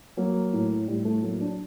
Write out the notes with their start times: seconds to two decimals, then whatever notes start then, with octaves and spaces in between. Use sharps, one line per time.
0.17 F#3 A#3
0.53 A2
0.88 A2 G3
1.05 A3
1.22 F#3 A#3
1.41 D4